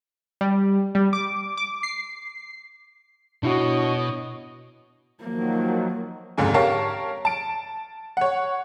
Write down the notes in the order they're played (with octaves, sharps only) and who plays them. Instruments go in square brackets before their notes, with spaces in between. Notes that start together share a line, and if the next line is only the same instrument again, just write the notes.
[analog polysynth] G3
G3
D6
D6
C7
[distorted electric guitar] B2 [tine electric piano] D4 E4 F#4 [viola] C#5 D#5
[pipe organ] D#3 F3 F#3 [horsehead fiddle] A#3
[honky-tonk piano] F1 C#2 G#2 D3 G#5
G4 A#4 C#5 F5 A5
A5 D7
C#5 F#5